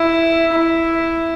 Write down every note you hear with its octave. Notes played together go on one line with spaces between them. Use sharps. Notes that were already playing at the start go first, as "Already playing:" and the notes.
Already playing: E4
E4